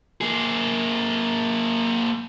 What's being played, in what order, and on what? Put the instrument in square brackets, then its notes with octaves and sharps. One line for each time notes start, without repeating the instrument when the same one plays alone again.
[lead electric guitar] A#3 G#4